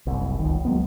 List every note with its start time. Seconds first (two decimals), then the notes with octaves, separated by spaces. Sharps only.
0.07 F#1 C2
0.39 C#2 D#3
0.65 F#3 G#3 A#3 B3